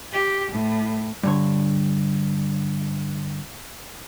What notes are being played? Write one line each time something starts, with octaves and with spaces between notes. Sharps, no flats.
G4
A2
G2 D3 C#5